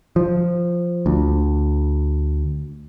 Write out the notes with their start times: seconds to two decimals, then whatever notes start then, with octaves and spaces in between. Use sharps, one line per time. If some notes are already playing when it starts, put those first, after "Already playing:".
0.16 F3
1.06 D2